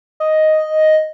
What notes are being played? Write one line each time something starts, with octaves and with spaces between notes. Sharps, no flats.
D#5